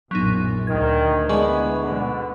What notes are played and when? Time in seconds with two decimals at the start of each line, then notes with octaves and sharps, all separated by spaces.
0.11 A#1 F#2 F#3 B3 D#4
0.67 D2 D#3 G#6
1.29 E3 G#3 B3 D4 B4 G#5 C#6
1.81 G#2 B2 D3 B3